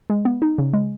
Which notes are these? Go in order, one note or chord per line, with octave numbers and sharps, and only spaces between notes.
G#3
B3
D#4
C#3
G#3